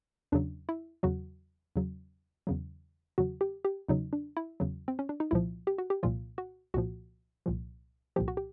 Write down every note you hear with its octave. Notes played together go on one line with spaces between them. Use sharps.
E2 C#3 F#3 D4
E4
E2 C#3 F#3 F#4
E2 C#3 F#3
E2 C#3 F#3
E2 C#3 F#3 F#4
G4
G4
E2 C#3 F#3 D#4
D4
E4
E2 C#3 F#3
C4
C#4
D4
D#4
C2 A#2 F3 E4
G4
F#4
G4
C2 A#2 F3 F4
F#4
C2 A#2 F3 F#4
C2 A#2 F3
C2 A#2 F3 G4
F#4
G4